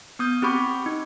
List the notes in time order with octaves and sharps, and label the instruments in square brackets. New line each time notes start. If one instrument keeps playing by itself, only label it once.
[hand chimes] B3 D#6 G6
C4 G4 B5 C#6 D6
D#4